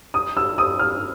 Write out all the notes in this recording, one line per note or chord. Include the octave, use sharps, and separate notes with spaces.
D#6
E6
D#6
F6